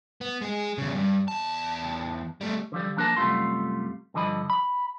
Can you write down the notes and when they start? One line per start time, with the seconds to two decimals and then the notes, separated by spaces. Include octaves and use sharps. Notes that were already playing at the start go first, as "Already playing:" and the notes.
0.21 B3
0.41 G#3 G#4
0.78 E2 C#3
0.95 G2
1.28 E2 A5
2.41 G3 A3
2.72 D3 F3 G3
2.97 F3 A#3 D4 G4 A#4 A5
3.17 F#2 C3 G3 A3 F4 C6
4.14 G2 D3 F3 D#5 B5
4.50 B5